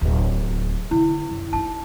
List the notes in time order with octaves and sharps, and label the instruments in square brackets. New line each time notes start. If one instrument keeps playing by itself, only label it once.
[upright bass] D1 F4
[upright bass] D3 [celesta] E4
[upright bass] F#2
[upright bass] D4 D#4 [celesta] A5